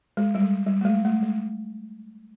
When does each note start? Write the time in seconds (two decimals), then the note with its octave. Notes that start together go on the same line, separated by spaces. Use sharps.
0.17 G#3
0.35 G3
0.42 G#3
0.67 G3
0.81 A3
0.85 G#3
1.05 A3
1.23 G#3